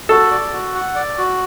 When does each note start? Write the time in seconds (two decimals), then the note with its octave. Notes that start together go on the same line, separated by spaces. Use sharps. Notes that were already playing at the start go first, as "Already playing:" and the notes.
0.09 F#4 A4
0.31 D5
0.53 F#4
0.75 F#5
0.96 D5
1.18 F#4